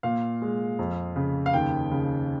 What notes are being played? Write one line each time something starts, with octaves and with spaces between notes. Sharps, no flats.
A#2 F5
G#3
F2
C#3
F5
D#2 G5
C#3